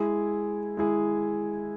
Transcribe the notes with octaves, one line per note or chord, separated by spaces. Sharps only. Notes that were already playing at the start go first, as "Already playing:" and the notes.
Already playing: G#3 E4 G#4
G#3 E4 G#4